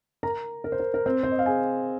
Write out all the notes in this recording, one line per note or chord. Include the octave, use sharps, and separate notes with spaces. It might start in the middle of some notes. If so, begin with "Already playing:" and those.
A#4 A#5
A#4
C5
A#4
A#4
C4 C5
C5
D#5
F5
G#4 G#5